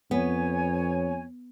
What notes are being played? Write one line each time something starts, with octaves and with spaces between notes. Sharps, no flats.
F2 B3 C#5 G#5